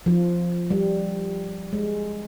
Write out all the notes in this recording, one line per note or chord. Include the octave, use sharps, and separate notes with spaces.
F3
G3
G#3